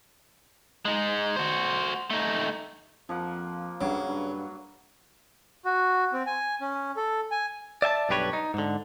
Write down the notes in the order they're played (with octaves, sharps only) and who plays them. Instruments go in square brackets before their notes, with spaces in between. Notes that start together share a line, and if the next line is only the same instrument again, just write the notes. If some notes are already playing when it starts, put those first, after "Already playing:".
[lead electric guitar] G#3 D#4
F#4 C5
A3 D#4
[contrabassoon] F2 [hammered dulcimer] F3 A#3 F#5
[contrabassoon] G2 [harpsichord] C#3 [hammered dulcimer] F#3
[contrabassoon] G2
[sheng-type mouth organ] F#4
C4
G#5
C#4
A4
G#5
[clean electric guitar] D5 E5 G#5 A5
B1 G2 D4 G4 B4 C#5
D#4
G#2 D3